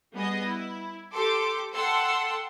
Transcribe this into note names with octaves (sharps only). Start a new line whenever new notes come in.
G3 B3 G#4 D#5
E4
G4 A4 C6 D6
A4 F#5 G5 A5 C6 E6